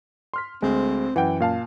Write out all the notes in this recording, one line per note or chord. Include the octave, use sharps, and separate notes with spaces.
C6 F6 B6
D2 G#3 C4
F#2 E3 F#5 G5
A#2 F5 A5